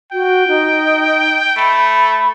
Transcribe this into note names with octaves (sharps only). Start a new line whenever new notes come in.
F#4 G5
D#4
A3 B5